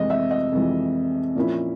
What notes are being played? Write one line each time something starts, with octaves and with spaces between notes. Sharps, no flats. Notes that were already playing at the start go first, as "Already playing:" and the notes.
Already playing: F2 C3 E3 G#3 D#5
E5
D#5
F2 C3 E3 G#3
A#2 F3 A#3 C#4 E4